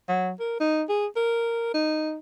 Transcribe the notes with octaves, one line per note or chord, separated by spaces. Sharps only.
F#3
A#4
D#4
G#4
A#4
D#4